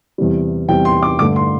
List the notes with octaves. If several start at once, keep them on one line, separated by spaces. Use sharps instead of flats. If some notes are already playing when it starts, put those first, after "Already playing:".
E2 C3 G3
E2 C3 G3 G5
C6
D6
G2 D3 A3 D6
C6